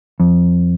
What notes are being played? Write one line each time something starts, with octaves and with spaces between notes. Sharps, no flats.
F2